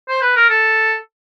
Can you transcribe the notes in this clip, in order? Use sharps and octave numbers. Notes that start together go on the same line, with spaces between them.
C5
B4
A#4
A4